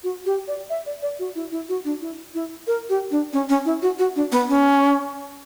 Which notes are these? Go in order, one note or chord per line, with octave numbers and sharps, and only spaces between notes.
F#4
G4
D5
E5
D5
D5
F#4
E4
E4
F#4
D4
E4
E4
A#4
G4
D4
C#4
C#4
E4
F#4
F#4
D4
B3
C#4